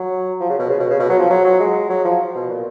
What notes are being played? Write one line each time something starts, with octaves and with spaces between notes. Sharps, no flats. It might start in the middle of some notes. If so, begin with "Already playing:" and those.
Already playing: F#3
F3
C#3
B2
C#3
B2
C#3
B2
F#3
F3
F#3
F#3
G#3
F#3
F3
B2
A#2